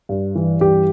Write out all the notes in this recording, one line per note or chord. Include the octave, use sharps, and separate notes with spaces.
G2
E3
G2 G4